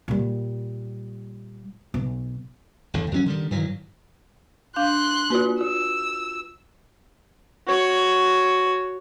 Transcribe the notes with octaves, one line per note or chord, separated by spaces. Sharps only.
A#2 G3
B1
G1 E2 D3
F2 F#3 G3 C#4
D3 D#3 G3
G2 D#3 E3 F#3
D4 F5 C6 F#6 G6
A#3 F4 F#4 B4
F4 E6
F#4 C#5